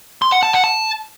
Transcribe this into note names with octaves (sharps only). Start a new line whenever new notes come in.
C6
F#5
A5
F#5
A5